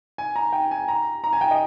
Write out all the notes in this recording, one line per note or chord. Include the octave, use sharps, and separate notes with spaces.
G#5
A#5
G5
G#5
A#5
A#5
G#5
G5
D#5